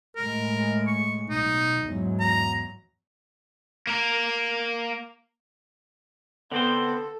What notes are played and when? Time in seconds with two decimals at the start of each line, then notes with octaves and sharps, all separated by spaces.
0.16 A2 G#3 A#4
0.87 C#6
1.30 B1 D#4
1.82 E2 G#2 F#3
2.20 A#5
3.87 A#3 A#4
6.51 D3 B3 C4 A4 C5